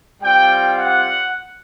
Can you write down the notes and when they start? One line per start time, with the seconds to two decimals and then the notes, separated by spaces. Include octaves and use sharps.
0.21 G3 C4 F4 G5
0.78 F#5